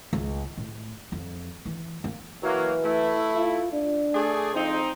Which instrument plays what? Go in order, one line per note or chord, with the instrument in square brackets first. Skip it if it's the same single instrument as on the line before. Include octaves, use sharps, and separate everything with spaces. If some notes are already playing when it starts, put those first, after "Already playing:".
[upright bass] C#2
A2
F2
E3
A#3
[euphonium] E3 [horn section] F#3 A#3
[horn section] A3 E4
[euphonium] F4
D4
[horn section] A3 G#4 D5
[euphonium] F2 [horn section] C4 D#4